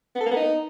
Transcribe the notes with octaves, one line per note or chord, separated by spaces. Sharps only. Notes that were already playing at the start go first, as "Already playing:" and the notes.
B3
A4
A#3
B3
D#4